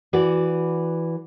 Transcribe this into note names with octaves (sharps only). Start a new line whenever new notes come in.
E3 F#4 B4 D5